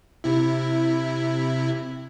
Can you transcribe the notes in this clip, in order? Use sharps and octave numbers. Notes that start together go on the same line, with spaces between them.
C3 E4